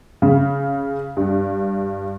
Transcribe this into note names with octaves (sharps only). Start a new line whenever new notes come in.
C#3
G2